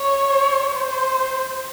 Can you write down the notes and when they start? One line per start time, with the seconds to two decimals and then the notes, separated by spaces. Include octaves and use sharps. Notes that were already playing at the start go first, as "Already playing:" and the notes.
Already playing: C#5
0.72 C5